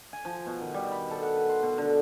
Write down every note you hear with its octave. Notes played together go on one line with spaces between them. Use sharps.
G#5
F3
B2
D#3
G3
B5
A4
F#5
B4
C6
B2
D3